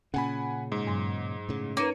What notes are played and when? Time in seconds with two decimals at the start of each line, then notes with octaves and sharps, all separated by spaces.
0.14 A#2 C#3 C#4 F#5 G#5 B5
0.72 G#2
0.87 G2 F#3 C6
1.49 A2 C#3
1.77 A#3 C#4 D#4 B4 C#5 C#7 D#7